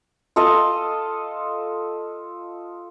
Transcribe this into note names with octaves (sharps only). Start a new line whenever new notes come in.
F4 A4 D#5 F5